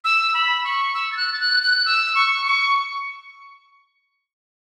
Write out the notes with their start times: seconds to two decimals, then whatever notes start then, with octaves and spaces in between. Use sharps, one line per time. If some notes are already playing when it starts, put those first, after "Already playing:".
0.04 E6
0.34 B5
0.64 C#6
0.94 E6
1.12 A6
1.17 F#6
1.33 A6
1.40 F#6
1.63 F#6
1.86 E6
2.15 C#6
2.46 C#6